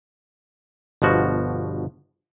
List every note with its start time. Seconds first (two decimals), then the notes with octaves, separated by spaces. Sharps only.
1.02 G1 B2 F3 F#4